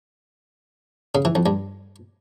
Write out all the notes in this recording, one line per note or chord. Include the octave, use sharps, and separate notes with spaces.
C#3
E3
F2
G2